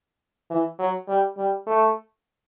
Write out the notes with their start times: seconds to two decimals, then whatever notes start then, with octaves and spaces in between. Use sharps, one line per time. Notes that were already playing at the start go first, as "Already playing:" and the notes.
0.50 E3
0.79 F#3
1.09 G3
1.38 G3
1.67 A3